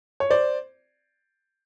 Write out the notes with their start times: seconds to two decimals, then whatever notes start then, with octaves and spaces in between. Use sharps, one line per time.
0.20 C#5
0.30 C5 D5